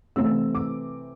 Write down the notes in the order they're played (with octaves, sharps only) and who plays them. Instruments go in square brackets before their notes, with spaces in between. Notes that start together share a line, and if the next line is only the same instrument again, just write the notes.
[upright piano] C3 E3 A3 C4 E6
D6